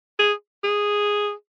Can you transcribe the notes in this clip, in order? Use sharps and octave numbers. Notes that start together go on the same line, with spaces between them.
G#4
G#4